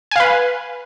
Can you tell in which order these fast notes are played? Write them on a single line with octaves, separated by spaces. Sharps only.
G#5 F5 B4